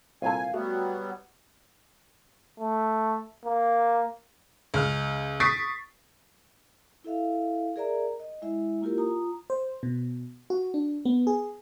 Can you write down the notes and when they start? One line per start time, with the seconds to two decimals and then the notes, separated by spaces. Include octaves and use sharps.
0.22 C2 A#2 A4 F5 G#5
0.54 F#3 G3 A3 B3 F#4
2.60 A3
3.45 A#3
4.74 C#2 F6
5.40 C#6 D#6 A6 B6 C7 D7
7.04 E4 A4 E5 F5
7.76 G#4 A#4 D5 E5 A#5
8.20 D#5
8.42 G#3 E4 E5
8.82 A#3 E4 F4 G4 A#4
8.98 F4 A#5 D#6
9.50 C5
9.83 B2
10.50 F#4
10.74 D4
11.05 B3
11.27 G#4